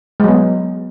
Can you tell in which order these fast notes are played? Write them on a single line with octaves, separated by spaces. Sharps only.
G#3 F#3 B3